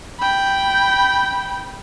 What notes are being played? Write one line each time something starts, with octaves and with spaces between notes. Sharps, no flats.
G5 B5